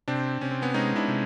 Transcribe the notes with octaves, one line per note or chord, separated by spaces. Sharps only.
C3 C4 D4
C3 C#4
C4
B3 C#4
G#3 C#4 D#4
D4 E4
C3